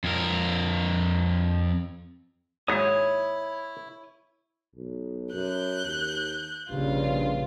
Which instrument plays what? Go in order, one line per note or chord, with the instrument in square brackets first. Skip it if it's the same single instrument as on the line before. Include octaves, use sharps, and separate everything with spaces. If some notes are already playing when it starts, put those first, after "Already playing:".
[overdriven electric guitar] F2 A#4
[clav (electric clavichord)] D#2 G#2 F#3 [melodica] E4 [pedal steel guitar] C#5 D#6
[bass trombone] B1
[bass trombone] F#2 [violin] F#6 G6
[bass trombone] D#2
[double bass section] A#1 C#3 [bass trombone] G2 [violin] F4